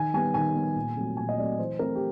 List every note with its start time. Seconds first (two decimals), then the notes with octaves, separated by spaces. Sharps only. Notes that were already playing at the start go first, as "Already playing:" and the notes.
Already playing: D#3 G#5
0.14 G3 B3 G#5
0.34 D#3 G#5
0.55 G3 B3
0.76 A#2
0.96 F#3 A3 C4
1.17 A#2 G#5
1.29 D#5
1.38 F#3 A3 C4 D5
1.59 E3 C5
1.79 A3 C4 A#4
1.95 G4